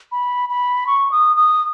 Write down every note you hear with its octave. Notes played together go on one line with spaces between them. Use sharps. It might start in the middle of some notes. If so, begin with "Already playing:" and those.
B5
B5
C#6
D#6
D#6